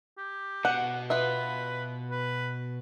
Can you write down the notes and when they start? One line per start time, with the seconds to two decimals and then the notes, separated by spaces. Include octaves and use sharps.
0.17 G4
0.65 B2 F#5
1.10 B3 F4 B4 E5
2.10 B4